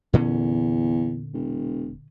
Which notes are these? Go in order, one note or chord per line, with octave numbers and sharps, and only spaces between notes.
E2 A#2 D3 C#4
E1